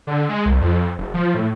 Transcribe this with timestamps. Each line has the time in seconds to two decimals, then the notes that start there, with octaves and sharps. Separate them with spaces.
0.07 D3
0.29 G#3
0.46 C2
0.61 F2
0.98 F#1
1.14 F3
1.35 A2